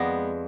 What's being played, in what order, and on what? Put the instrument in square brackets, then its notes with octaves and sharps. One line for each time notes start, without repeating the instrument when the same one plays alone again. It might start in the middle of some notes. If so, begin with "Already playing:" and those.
Already playing: [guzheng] F2 G#3 B3 D5